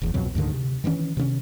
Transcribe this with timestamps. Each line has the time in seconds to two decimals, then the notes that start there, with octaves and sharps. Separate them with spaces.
0.02 F1 E2
0.14 C2 F2 B2 F#3
0.35 D2 G#2 D3 D#3
0.53 C3
0.84 D#3 E3 G#3 C#4
1.17 C3 D#3 C4 C#4